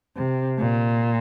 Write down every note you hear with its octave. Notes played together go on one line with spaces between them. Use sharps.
C3
A#2